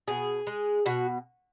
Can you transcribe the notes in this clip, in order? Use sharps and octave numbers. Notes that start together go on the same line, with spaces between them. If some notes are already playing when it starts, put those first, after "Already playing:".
B2 G#4
G#3
B2 F#4